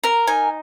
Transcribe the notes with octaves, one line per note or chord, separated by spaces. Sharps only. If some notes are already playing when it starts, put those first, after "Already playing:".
A#4 A#5
D#4 G#5